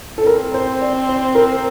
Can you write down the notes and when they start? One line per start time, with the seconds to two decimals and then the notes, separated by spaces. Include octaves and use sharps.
0.18 A4
0.26 C4 A#4
0.54 C5
0.81 D5
1.09 C5
1.35 A#4